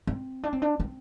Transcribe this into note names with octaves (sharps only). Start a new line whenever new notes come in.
C4
D4
C4
D4
C4